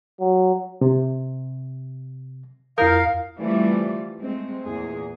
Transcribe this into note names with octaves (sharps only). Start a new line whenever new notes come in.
F#3
C3
F2 E4 A#4 F5 D#6 F6 G6
E3 G3 A3 C4 F4 D5
G#3 A3 C4
E2 A#2 G#4